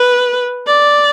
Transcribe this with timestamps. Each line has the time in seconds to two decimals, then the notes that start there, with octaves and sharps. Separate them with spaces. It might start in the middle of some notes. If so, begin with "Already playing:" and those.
Already playing: B4
0.67 D5